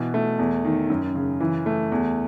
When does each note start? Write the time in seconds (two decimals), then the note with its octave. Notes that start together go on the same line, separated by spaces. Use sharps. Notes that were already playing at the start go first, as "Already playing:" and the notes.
Already playing: B2 E3
0.14 A3
0.39 E2
0.65 D#3
0.90 F#2
1.15 C#3
1.40 E3
1.66 A3
1.92 E2